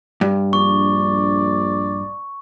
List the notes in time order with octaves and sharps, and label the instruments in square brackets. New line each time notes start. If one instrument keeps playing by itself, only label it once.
[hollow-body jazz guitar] G2
[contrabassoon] A#1 [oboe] D5 [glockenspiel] C#6